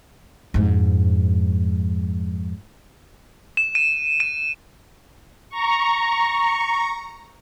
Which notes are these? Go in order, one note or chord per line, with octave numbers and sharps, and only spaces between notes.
F2 G#2
E7
D#7
D#7
A#5 C#6